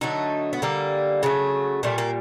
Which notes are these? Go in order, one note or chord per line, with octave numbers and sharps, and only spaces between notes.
D3 F#3 A3 D#4
B3
D3 G3 A#3
C#3 F#3 A3
A#2 G3 A3
A#3